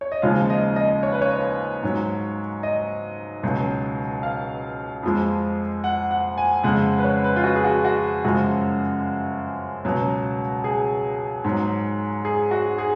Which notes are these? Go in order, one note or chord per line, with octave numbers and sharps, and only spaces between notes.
C#5
D#5
D#2 C#3 F3 G#3 F5
D#5
D#5
C#5
B4
C#5
G#2 F#3
D#5
C#2 B2 F#3
F5
F2 F3 G#3
F#5
F#5
G#5
F2 C#3 G#3 F#5
B4
C#5
B4
F4
F#4
G#4
F#4
F#4
F#2 C#3 F3 G#3 F#4
C#2 B2 F#3
G#4
G#2 F#3
G#4
F#4
G#4